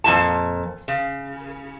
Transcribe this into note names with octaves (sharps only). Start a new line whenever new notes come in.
F2 A#2 A5
C#3